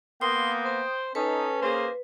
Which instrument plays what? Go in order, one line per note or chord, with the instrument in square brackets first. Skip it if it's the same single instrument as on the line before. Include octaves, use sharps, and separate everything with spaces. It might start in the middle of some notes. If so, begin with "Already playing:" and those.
[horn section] A#3 B3 [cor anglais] G5 [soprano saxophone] C6 [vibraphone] D#6
[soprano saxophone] C5
[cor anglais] C#4 [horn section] D#4 [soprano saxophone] A4 [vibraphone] B4
[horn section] A#3 G#4 [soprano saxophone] C5